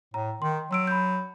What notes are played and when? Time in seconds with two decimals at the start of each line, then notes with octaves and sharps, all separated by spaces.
0.14 A2 A#5
0.42 D#3 C6
0.71 F#3 C6 E6 D7
0.87 B5 G6